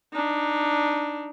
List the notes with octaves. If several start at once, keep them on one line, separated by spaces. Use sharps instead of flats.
D4 D#4